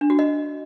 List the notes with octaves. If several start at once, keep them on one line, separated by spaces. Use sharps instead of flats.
D4
F#4
D#5